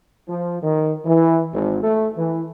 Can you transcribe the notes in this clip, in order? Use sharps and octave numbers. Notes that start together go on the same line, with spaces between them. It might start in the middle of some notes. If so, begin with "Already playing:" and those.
F3
D#3
E3
G#1
A3
E3